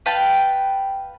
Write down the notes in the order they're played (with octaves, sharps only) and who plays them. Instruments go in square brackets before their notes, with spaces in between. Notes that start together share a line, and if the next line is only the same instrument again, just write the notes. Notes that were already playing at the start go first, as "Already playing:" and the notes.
[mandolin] B4 F5 G5 A5